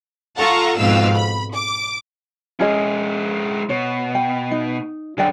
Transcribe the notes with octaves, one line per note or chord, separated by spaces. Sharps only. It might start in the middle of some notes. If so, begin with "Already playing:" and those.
F4 A4 F#5 A5 A#5 C#6
F2 G#2 B2 C4 F5 E6
B5
D6
G#3 C#4 E4 G#4 D#5
B2 C#5
G5
D#4
F#2 D3 G#4 D5 G5